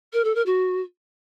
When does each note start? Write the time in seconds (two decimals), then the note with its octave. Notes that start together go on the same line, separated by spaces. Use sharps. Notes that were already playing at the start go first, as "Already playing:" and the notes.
0.13 A#4
0.24 A4
0.35 A#4
0.46 F#4